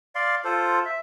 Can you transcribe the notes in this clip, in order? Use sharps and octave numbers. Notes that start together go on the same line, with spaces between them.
D5 F5 C6
F4 A4 C5
E5